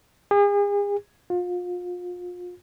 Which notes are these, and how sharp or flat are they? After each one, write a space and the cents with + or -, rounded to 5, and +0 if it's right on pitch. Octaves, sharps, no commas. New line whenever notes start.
G#4 -40
F4 +35